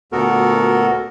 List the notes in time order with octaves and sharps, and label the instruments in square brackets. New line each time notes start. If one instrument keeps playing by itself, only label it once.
[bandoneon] D2 A#2 B3 F#4 A4 A#4